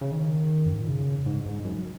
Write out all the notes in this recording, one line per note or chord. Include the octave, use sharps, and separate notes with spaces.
C#3
D#3
F#2
G#2
A#2
C#3
G#2
G#2
F#2